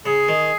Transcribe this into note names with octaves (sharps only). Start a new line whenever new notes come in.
C#3 G#4
D#3